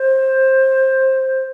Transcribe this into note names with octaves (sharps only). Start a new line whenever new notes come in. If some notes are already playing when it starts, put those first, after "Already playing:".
Already playing: C5